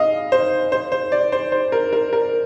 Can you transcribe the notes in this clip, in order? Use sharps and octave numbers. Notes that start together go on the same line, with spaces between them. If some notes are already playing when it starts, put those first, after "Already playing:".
Already playing: D#5 F5
C5
C5
C5
D5
C5
C5
A#4
A#4
A#4